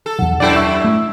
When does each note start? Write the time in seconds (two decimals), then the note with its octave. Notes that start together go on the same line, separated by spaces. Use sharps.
0.06 A4
0.19 B1 E2 F#5
0.40 F#2 E4 A4 D5 G5 D6
0.56 E5 C#6 E6
0.85 A2